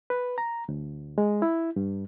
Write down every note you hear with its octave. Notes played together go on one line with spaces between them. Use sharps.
B4
A#5
D2
G#3
E4
G2